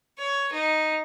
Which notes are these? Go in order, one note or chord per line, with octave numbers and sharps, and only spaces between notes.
C#5
D#4